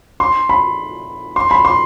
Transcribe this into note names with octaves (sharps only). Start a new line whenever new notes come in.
C6
B5
C6
B5
C6